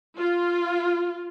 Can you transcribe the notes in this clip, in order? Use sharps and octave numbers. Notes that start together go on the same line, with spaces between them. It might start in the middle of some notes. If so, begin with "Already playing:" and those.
F4